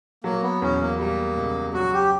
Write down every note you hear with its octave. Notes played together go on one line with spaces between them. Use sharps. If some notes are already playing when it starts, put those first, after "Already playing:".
F#3 A#3
B3
E2 C#4
A#3
G3 A#3
C#2
F#3 F#4
G4